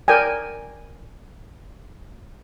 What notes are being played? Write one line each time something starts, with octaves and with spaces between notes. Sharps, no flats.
A#4 D5 G5 G#5